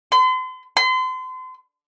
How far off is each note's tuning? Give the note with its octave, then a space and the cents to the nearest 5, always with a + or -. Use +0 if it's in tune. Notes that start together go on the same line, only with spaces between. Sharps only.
C6 -40
C6 -35